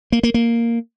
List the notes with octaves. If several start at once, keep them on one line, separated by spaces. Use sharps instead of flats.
A#3
A#3
A#3